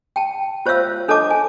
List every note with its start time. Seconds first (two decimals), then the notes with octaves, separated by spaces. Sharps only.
0.16 G5 A5
0.66 F4 C5 C#5 E5 F5 E6
1.08 D4 A4 C#5 D#5 A5 D6
1.31 G#5